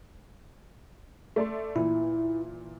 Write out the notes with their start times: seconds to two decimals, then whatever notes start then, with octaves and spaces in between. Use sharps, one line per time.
1.36 A3 D5 C6
1.76 A#2 E3 E4